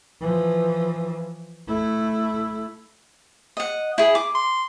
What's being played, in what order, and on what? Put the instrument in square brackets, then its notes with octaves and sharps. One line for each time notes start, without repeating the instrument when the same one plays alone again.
[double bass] E3 F3
A3 E4
[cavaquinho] D#5 F#5
E4 G#4
D6
[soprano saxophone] C6